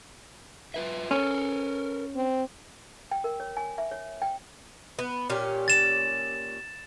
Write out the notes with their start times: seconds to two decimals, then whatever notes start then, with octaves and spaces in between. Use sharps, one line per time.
0.74 F4 B4 E5
1.11 C#4 A4 A#4
2.16 C4
3.11 G5
3.24 A#4
3.40 C#5
3.57 G#5
3.78 E5
3.91 C#5
4.22 G5
4.99 B3
5.30 A#2 C#4 G4
5.68 A6 E7